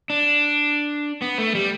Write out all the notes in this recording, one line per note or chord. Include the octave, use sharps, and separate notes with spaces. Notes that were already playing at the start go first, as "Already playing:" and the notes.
D4
B3
A3
G3